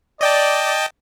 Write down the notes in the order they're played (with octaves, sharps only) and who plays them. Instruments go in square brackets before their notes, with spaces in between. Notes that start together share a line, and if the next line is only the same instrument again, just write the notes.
[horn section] D5 [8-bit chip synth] D#5 G5 A5